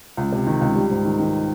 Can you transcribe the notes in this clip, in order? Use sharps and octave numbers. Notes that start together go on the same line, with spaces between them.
C#2
C3
D#3
C#2
G3
G#2
D#3
D#3